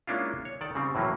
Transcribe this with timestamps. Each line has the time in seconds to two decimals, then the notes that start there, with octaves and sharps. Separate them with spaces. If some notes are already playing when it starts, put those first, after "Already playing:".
0.07 G#3 A#3 C#4 D4 E4 F4
0.45 C#5
0.61 D#3 A4 D5
0.75 C#3 G3 C4
0.95 A2 E3 F#3 A#3 C#4